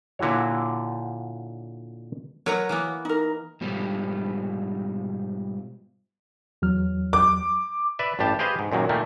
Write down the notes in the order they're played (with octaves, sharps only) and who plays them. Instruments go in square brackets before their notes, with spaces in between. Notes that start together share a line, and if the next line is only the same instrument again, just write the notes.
[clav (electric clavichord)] A#2 D3 E4 F#4 C#5
[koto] F#3 B4 A#5 [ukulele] A#4 C#5
[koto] E3 A#3 B3
[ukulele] D#4 A#4
[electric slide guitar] G#2 B2 F3 G3
[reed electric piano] E2 F#3 F6
[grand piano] D6
[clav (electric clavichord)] B4 D5 E5
A1 G2 D4 G4 A5
G4 G#4 B4 C5 D#5 F5
G#2
F#2 A#2 D#3 F#3
A#2 D#3 A3 A#3